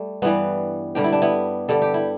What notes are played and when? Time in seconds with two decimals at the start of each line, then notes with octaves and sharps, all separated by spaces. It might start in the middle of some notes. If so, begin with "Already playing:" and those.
Already playing: G3 A3
0.22 G2 E3 G3 B3
0.95 G2 D3 G3 G4
1.04 E4
1.13 D4
1.22 B3 E4
1.69 G2 D3 G3 A4
1.82 G4
1.94 E4